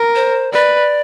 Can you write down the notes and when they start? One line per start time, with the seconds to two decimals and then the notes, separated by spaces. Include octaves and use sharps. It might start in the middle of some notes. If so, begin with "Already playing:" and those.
Already playing: A#4
0.15 C5
0.52 B4 D5